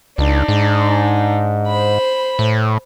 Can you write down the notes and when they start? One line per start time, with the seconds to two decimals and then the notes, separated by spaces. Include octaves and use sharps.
0.18 C#2 D4 D#4
0.48 G#2
1.67 C5 B5
2.39 A2